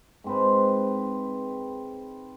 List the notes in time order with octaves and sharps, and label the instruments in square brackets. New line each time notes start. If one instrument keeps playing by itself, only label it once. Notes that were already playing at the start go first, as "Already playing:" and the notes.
[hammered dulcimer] G#2 C4 B4